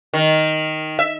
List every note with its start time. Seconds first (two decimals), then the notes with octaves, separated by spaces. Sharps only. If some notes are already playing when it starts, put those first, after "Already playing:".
0.14 D#3
0.99 E5